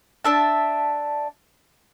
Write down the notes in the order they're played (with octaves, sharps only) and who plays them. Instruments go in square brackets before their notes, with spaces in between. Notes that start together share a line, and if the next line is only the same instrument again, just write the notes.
[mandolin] D4 E5 A5